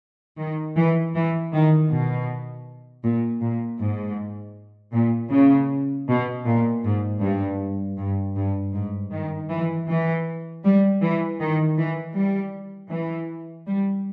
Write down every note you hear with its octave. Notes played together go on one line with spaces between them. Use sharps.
D#3
E3
E3
D#3
B2
A#2
A#2
G#2
A#2
C#3
B2
A#2
G#2
G2
G2
G2
G#2
D#3
E3
E3
G3
E3
D#3
E3
G3
E3
G3